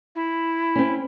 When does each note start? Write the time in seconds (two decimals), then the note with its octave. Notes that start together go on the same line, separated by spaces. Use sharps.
0.15 E4
0.76 C4 C#4